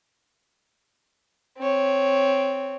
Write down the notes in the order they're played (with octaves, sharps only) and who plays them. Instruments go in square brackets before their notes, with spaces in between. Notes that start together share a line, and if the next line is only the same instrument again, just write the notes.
[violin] C4 C#5